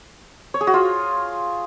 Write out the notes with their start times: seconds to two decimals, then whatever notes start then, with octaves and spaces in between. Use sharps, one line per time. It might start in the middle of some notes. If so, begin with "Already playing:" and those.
0.54 C#5
0.61 G#4
0.67 F#4
0.74 F4